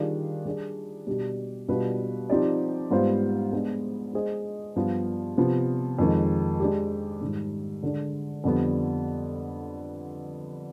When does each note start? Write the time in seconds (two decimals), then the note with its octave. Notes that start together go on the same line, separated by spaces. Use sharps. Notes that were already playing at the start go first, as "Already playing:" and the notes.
Already playing: D#3 G3 D4 F4 G#4
0.45 G3 D4 G#4 D5
1.07 B2 G3 D4 G4
1.68 B2 G3 D4 F4 B4
2.30 F3 C4 D#4 G4 D5
2.91 G#2 G3 B3 F4 C5
3.53 G#3 B3 D4
4.13 G#3 D4 G#4 C5 D#5
4.76 G2 F3 B3 F4
5.37 C3 F3 B3
5.99 F2 D#3 G#3
6.60 G#3 D4 G4
7.21 G#2 D#3 G3
7.83 D3 G#3 D4
8.44 F2 D3 G3 B3